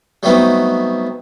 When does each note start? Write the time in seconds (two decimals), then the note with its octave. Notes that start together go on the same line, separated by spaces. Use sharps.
0.23 F#3 G3 A3 B3 C4 D#4